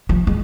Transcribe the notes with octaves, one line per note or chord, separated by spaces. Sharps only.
F3
G#3